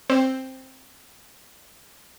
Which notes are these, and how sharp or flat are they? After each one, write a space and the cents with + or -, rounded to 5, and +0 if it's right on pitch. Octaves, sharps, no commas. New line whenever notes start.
C4 +10 C5 +0